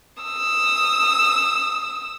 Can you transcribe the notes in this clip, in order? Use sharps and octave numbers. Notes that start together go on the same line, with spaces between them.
D#6 E6